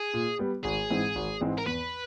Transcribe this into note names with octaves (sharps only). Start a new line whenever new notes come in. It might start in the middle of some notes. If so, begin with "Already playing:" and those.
Already playing: G#4
A#2
G3 B3
G#1 G#4
G#2 E3 G#3 C4
G#1
G#2 E3 G#3 C4
A#4
E2 B4